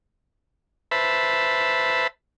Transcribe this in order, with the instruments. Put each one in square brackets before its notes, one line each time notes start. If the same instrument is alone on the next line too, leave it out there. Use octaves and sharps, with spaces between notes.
[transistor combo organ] B4 C5 E5 A5 B5